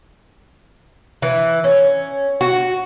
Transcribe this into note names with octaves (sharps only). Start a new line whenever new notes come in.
E3
C#4
F#4